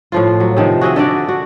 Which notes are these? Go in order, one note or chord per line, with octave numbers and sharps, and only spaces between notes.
A2 F3 F4
F#3
C3 D#3 F3
F#4 G#4 D#5 E5
D3 F#4 D5
F#4